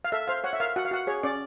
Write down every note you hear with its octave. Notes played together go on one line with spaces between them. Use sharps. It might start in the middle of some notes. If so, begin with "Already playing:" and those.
F5
A4 E5
C5 F5
C#5 F#5
E5
A#4 F5
F#4 F#5
F5
F#4 F#5
G#4 C#5
C#4 D5